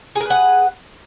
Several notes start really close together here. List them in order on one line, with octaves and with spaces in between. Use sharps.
G#4 A#4 B4 F#5